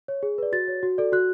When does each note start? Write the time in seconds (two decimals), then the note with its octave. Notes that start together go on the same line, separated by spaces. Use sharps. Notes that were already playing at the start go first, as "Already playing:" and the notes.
0.08 C#5
0.23 G#4
0.38 B4 D5
0.52 F#4 A6
0.68 C#5
0.83 F#4
0.98 A4 D5
1.13 F#4 F#6